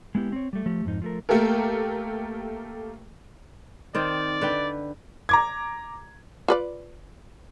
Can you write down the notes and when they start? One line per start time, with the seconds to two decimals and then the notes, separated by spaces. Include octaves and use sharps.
0.15 G#3 B3 E4 G4
0.32 C4 C#5
0.53 G3 A3
0.66 F3 A3 G4
0.85 F2 G#2 D#4
1.02 F3 A3 A#4
1.29 A3 A#3 G4 A4 A#4
3.95 D#3 C4 D5 G5
4.41 D3 B4 G5
5.29 A#5 D6 G#6
6.48 F4 B4 D5